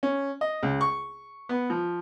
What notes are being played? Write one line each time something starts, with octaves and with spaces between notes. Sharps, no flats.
C#4
D#5
C#2
C#6
B3
F3